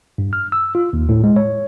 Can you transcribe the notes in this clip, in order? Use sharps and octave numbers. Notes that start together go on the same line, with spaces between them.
G2
F6
E6
F4
D#2
A2
G#3
C#5